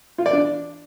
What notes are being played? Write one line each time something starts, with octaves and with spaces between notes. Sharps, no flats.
F4
D5
D4